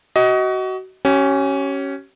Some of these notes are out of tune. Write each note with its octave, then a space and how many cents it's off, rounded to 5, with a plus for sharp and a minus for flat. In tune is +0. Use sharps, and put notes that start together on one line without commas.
F#4 +25 D#5 +20
C#4 -5 G4 -45